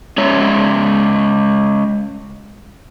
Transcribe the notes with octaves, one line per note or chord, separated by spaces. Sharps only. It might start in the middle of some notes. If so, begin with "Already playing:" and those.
G#3 C#4 C#5 E5